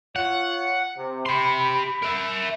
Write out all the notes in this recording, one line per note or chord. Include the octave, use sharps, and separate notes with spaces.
F4 C#5 F#5
C3
G4 B5 C6
A#4 E5